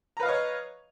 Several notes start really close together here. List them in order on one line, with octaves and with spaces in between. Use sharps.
A#5 B4 F5 D#5 C#5